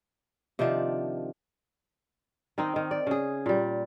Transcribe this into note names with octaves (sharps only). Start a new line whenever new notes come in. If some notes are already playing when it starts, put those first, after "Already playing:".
C3 D#3 F3 D4
D#3 C4 D#4
D#3
D5
C#3 G#4
A#2 G3